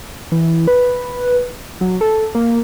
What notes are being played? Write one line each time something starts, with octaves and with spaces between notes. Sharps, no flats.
E3
B4
F#3
A4
A#3